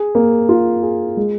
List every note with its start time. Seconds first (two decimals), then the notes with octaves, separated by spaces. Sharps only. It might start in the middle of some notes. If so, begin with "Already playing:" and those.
Already playing: G#4
0.15 A#3
0.49 F4
0.83 G#4
1.17 G#3